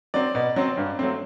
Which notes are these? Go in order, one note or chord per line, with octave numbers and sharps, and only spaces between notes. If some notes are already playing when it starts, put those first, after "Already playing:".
F#3 C4 D5
B2
F#3 C4
G2
F#3 A3 C4